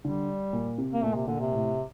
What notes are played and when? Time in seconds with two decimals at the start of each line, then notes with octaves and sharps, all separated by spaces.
0.04 D3 G3
0.53 A#2
0.78 C3
0.93 A#3
1.03 A#2 A3
1.15 C3
1.27 A#2 D3
1.40 C3
1.53 A2